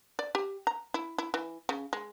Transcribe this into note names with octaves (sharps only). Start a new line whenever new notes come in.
D5
G4
A#5
E4
E4
E3
C#3
G#3